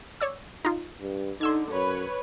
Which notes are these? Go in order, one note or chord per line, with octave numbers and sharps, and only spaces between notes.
C#5 D5 E6
D#4 F4
G2
D3 D#4 C6 E6 G#6
F#2 B4 C#5